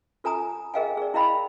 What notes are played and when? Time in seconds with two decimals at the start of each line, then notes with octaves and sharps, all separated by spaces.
0.24 F4 A4 G#5 A#5 D#6
0.74 G#4 A#4 D#5 F5 G5 G#5
0.97 G#4 D5
1.14 E4 A#4 D#5 F5 G5 B5